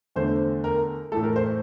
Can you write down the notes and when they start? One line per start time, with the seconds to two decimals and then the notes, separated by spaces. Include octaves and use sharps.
0.16 E2 D3 A3 C5
0.64 A#4
1.12 A2 E3 A3 A4
1.24 A#4
1.36 C5